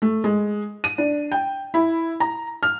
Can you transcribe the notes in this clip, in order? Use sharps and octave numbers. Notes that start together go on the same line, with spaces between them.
A3
G#3
D#7
D4
G5
E4
A#5
F6